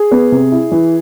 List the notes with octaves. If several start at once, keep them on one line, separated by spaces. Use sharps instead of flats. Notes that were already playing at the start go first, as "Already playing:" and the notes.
Already playing: G#4
B3
C3
E4
E3